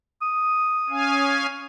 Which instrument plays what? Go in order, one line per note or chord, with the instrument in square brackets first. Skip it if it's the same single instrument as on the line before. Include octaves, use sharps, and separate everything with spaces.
[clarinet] D#6
[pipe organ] C#4 F5 G#5